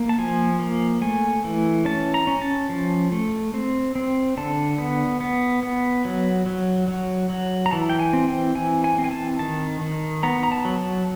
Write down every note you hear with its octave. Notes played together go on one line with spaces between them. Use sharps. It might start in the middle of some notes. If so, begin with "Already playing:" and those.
Already playing: A#3
A5
F3 G#5
A#3
A3 G#5
E3
C#4 A5
A#5
C#4
A5
F3
A3
C4
C4
D3 A5
B3
B3
B3
F#3
F#3
F#3
F#3
A#5
E3 A5
G5
G#5
C4
G5
E3 G#5
G#5
C4
G#5
A5
D#3 A5
D#3
B3 A#5
A#5
A5
F#3
A5